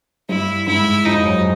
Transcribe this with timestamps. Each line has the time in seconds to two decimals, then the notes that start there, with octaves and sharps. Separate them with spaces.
0.29 G2 G3 E4
0.67 G#2 G#3 E4
1.05 F2 F3 D#4
1.25 F#2 F#3
1.37 F#3